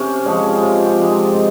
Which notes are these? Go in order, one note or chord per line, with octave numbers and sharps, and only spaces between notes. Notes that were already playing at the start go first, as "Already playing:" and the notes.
Already playing: C3 C#4
F3 G#3 C#4
C3 F4
G4
F3 G#3 D#4
F4
C3 F4